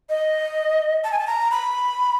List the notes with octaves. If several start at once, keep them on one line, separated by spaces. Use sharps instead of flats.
D#5
A5
G#5
A5
A#5
B5